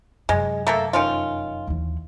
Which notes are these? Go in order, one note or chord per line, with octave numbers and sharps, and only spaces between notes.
F1 F#2 G#3
A3 A#3 A4
D#3 C#4 F4
D#2 E3